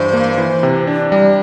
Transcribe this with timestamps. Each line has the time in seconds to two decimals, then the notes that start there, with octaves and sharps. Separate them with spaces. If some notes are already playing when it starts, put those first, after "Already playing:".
Already playing: G2 E3 C5
0.13 A#3
0.38 E3
0.63 C3
0.87 D4
1.11 G3 D5